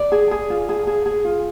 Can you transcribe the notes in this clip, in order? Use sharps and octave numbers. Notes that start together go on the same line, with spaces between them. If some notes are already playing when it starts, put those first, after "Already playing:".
Already playing: D5
G#4
G#4
F4
G#4
G#4
G#4
F4